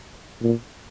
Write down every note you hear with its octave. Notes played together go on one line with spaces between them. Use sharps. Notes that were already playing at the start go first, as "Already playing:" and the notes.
A#2